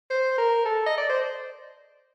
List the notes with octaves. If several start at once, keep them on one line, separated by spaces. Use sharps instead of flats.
C5
A#4
A4
D#5
D5
C5